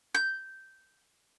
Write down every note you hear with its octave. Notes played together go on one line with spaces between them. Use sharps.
G6